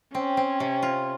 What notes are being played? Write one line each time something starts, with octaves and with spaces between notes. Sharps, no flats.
C4 C#4
C4
C3
F4